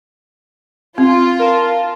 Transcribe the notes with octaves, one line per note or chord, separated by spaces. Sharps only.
C4 F4
A#4 A5